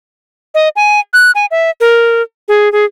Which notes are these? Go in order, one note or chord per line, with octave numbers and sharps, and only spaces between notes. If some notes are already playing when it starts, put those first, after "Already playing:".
D#5
G#5
F#6
G#5
E5
A#4
G#4
G#4